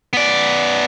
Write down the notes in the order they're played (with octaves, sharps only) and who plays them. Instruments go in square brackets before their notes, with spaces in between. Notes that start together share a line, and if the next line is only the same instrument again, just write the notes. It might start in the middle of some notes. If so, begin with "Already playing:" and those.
[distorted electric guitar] B3 D5